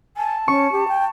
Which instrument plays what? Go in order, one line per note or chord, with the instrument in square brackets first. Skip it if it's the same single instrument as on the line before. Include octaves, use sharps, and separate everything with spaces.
[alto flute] G#5 [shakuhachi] A5
[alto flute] C#4 [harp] C#6
[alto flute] G4
G5